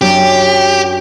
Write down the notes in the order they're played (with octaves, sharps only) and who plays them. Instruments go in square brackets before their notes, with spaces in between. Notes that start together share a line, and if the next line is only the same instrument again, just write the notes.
[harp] F#2 D4 [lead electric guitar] G4